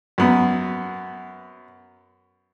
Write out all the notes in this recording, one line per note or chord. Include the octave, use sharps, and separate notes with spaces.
F#2 B3